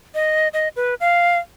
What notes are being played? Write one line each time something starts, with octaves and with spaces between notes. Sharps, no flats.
D#5
D#5
B4
F5